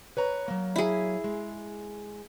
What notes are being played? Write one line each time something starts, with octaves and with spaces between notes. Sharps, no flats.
B4 C#5 A#5
F#3 A#3
E4 G#4
G#3